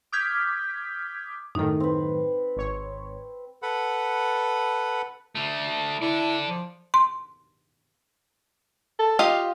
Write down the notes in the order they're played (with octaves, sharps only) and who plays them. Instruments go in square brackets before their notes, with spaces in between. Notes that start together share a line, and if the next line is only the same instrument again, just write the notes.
[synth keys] D6 D#6 F6 G6 G#6 B6
[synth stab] F#2 A2 D#3 [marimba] D#4 A4
[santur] C4 B4
[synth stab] G#1 C#5
[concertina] A4 B4 F#5 B5
[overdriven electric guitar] D3 A3
[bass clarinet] E4 [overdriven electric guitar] A4 D5
[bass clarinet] F3
[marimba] C6
[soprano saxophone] A4
[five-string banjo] F4 G4 D#5 [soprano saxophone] F5